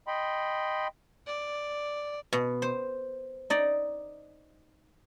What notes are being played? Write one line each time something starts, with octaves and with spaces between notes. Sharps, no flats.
D#5 G5 B5 C6
D5
B2
C5
D#4 D5